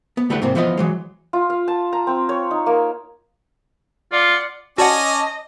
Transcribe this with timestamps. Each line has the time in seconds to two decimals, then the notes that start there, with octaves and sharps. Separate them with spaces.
0.17 B3
0.30 D3 G3 A3 E4 B4 F#5
0.42 G#2 C3 A#3 C4
0.55 E3 F3 B3 F4 D#5
0.77 E3 F#3 G#3
1.33 F4
1.50 F5
1.68 A5
1.93 A#5
2.07 C4
2.29 C#5
2.51 D#4
2.66 A#3
4.12 F4 D5 F#5
4.78 C#4 F#4 D5 D#5 F#5 G#5 A5 D6